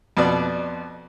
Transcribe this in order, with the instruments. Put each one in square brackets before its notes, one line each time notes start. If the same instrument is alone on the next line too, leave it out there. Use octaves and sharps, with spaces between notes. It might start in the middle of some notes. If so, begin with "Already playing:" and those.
[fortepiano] F2 B2 D5